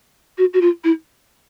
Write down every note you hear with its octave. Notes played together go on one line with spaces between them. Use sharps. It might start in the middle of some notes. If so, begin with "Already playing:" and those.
F#4
F#4
F4
E4